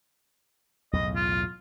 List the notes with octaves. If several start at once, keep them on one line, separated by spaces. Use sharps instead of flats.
B1 E2 A2 D#5
F4